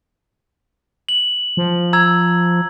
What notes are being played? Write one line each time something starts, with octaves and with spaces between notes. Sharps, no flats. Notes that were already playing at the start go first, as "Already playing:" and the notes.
F#7
F3
A#5 E6 G#6